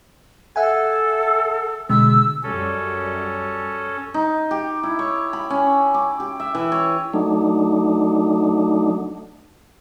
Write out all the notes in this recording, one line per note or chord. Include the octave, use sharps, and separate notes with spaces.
A4 E5 F#5 G#5
B2 D3 G#3 E6
F#2 G3 C#4 A4
D#4
G4
E4
C#5
B5
C#4
D6
G4
E5
E3
C#5
F#3 A3 D4 D#4